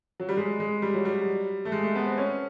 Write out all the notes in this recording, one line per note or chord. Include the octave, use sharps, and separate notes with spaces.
F#3
G3
G#3
G#3
G3
F#3
G3
A3
G#3
A3
B3
C4
C#4